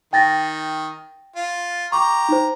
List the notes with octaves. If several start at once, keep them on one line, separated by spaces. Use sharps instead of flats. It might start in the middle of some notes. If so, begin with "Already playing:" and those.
D#3 G5 A6 A#6
F4
G4 A#5 C#6 D6
D#4 C5